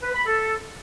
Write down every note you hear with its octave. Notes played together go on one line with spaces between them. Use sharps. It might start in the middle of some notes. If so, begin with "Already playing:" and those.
B4
B5
A4